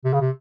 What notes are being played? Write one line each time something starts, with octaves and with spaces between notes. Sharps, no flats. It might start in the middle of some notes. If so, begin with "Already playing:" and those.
C3
C#3
C3